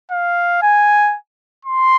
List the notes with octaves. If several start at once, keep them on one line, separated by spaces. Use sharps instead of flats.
F5
G#5
C6